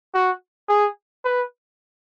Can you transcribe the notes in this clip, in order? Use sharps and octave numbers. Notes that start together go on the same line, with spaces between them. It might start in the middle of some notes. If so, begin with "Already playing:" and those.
F#4
G#4
B4